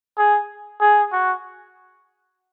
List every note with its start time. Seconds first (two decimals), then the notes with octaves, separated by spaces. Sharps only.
0.18 G#4
0.81 G#4
1.12 F#4